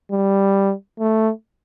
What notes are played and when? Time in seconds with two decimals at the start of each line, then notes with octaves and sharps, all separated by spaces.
0.12 G3
0.99 A3